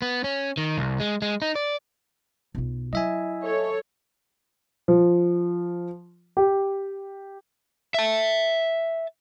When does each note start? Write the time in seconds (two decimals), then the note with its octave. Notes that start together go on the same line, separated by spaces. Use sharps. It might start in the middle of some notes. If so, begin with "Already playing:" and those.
0.02 B3
0.24 C#4
0.57 D#3
0.78 C2
1.00 G#3
1.22 G#3
1.42 D#4
1.55 D5
2.55 B1 F4
2.93 F#3 E4 D#5 E5 G#5
3.43 A4 C#5
4.88 F3
6.37 G4
7.94 E5 A5